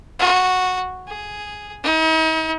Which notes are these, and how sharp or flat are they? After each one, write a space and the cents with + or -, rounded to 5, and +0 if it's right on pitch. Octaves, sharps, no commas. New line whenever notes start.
F#4 -10
G#4 +0
D#4 +45